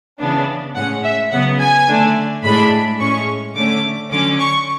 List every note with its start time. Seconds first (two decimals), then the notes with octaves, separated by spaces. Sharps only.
0.20 C#3 E3 B3 D4
0.75 A2 G#3 C#4 F#5
1.03 E5
1.32 C#3 F#3 B3 F#5
1.60 G#5
1.88 D3 A3 D4
2.44 A2 G#3 D4 B5
3.00 A2 G#3 C#4 C#6
3.56 D3 A3 C#4 D6
4.11 D3 F#3 C#4 D6
4.40 C#6